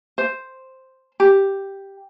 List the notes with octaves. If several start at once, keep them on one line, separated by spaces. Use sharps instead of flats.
C5
G4